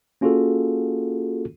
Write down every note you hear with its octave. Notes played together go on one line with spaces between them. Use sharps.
A#3 C#4 F4 F#4 G#4 A4